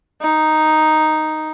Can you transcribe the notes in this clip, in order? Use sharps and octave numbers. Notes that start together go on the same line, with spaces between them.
D#4